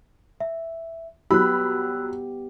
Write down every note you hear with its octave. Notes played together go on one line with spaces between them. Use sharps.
E5
F#3 B3 G4 B5 E6 F#6